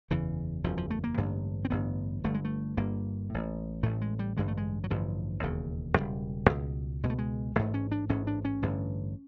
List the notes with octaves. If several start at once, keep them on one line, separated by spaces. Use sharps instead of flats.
F#1 E2 C#3 E3
F#1 E2 C#3 F3
F3
A3
A#3
A1 G2 D3
C4
A1 G2 D3 B3
G1 G2 D3 A3
G#3
A3
G1 G2 D3 A#3
A1 A2
A1 A2 A3
G#3
G3
A1 G2 D3 G#3
A3
G#3
F#3
A1 G2 D3 F3
E1 D#2 C#3
E1 D#2 C#3 G3
C#2 B2
C#2 B2 G#3
A3
G#3
A1 G#2 A3
C#4
D4
A1 G#2 C#4
D4
C#4
A1 G2 D3